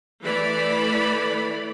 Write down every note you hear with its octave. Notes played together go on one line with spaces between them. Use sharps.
E3 A3 D5 B5